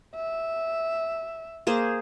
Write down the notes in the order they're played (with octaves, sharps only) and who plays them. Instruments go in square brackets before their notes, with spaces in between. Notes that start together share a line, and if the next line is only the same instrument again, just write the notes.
[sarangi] E5
[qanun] A#3 G#4 C5